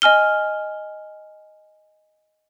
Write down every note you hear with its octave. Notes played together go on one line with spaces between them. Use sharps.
D#5 G#5 F6 G7